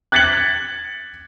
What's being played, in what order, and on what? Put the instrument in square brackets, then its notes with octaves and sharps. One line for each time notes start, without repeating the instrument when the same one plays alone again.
[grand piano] F#6 G#6 A6 B6 C#7 F#7